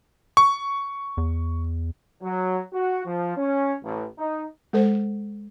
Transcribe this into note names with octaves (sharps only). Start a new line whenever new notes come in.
C#6
E2
F#3
F#4
F3
C#4
A1
D#4
G#3 A4 C5